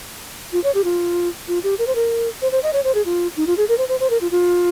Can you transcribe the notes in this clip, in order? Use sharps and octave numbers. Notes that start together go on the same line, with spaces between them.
F4
C#5
G4
F4
F4
G4
A#4
C5
A#4
C5
C5
D#5
C#5
C5
G#4
F4
D#4
F4
G#4
A#4
C5
C5
C5
A#4
F4
F4